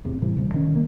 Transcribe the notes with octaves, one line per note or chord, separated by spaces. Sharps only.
A1 E2 C3
A2 C3 E3 G3
D#1 C2
D#3 C#4
C2 A#3